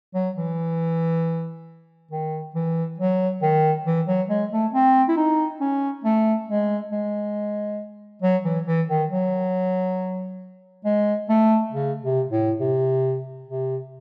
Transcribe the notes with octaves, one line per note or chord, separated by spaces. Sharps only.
F#3
E3
D#3
E3
F#3
D#3
E3
F#3
G#3
A3
C4
E4
D#4
C#4
A3
G#3
G#3
F#3
E3
E3
D#3
F#3
G#3
A3
C#3
C3
A2
C3
C3